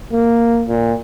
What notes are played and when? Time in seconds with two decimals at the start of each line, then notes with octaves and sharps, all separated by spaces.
0.13 A#3
0.69 A#2